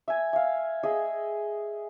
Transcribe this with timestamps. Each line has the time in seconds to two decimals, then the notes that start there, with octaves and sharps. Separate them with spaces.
0.08 E5 G#5
0.33 E5 F5
0.83 G#4 D#5 E5